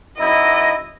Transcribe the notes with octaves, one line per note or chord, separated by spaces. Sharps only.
F#2 D#4 E4 D#5